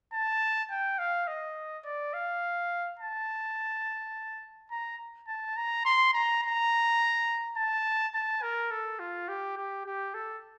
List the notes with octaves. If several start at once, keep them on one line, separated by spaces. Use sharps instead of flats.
A5
G5
F5
D#5
D5
F5
A5
A#5
A5
A#5
C6
A#5
A#5
A5
A5
A#4
A4
F4
G4
G4
G4
A4